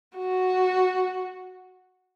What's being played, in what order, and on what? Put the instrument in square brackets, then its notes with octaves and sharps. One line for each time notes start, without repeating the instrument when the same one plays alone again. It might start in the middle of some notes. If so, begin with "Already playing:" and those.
[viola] F#4